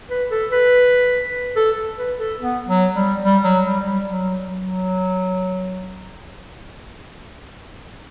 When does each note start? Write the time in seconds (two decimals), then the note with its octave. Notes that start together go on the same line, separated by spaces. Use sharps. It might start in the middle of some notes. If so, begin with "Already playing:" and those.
0.10 B4
0.31 A4
0.52 B4
1.56 A4
1.98 B4
2.19 A4
2.39 B3
2.68 F#3
2.95 G3
3.23 G3
3.44 F#3
3.65 G3
3.85 G3
4.06 F#3
4.48 F#3